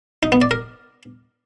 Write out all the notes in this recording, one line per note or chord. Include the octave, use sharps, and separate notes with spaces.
D#4
B3
D5
A#4